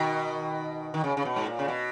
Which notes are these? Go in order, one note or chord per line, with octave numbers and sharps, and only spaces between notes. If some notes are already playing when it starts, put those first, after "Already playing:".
Already playing: B2 D#3
D#3
C#3
C#3
B2
G#2
A#2
C#3
B2